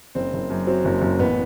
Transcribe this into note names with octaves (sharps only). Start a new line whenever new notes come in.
F#1 C4
F#1
F#2
F#3 C4
F#1
F#1
A1 B3